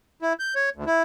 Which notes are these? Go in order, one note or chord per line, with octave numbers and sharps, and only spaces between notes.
E4
G6
C#5
D2
E4